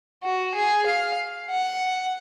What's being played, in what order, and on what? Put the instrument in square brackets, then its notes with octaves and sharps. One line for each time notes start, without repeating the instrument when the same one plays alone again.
[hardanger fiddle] F#4
G#4
F5
F#5